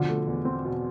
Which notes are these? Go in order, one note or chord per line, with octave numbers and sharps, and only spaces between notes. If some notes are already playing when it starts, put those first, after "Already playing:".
Already playing: B2 D3 F3
A3
E2
C4
B2